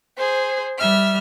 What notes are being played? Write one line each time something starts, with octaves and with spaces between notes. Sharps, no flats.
G#4 C5
G3 E5 F6